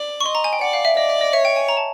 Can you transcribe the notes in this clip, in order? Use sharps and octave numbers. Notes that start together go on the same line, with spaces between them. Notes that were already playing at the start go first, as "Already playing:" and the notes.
Already playing: D5
C#6
D#5 C6
A#5
G#5
G5
D5 F#5
F5
E5
D5 D#5
E5
D#5
C#5 E5
G5
G#5
A#5
A5